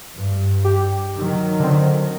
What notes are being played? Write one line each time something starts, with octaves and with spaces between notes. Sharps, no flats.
G2
G4
D#3 F#3
D3 C4